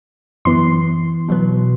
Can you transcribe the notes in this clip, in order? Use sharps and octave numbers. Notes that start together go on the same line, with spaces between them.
F#2 E3 B3 C6
B2 F#3 B3